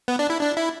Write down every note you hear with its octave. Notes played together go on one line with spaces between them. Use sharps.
B3
D4
E4
D4
E4